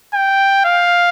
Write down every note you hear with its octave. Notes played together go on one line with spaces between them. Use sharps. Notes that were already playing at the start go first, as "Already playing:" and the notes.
G5
F5